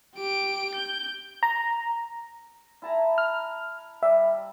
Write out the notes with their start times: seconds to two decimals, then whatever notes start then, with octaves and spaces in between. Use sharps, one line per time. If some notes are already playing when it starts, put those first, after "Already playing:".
0.15 G4 D7
0.75 G6
1.43 A#5
2.82 E4 A5 A#5
3.18 F6
4.03 G3 E5